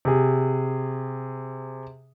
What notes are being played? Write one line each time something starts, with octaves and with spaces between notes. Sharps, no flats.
C3 G#4